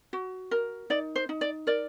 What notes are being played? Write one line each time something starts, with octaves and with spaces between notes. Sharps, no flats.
F#4
A#4
D#4 D5
C5
D#4
D5
A#4 D5